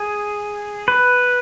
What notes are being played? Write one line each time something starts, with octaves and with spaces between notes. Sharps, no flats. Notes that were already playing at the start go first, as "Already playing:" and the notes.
Already playing: G#4
B4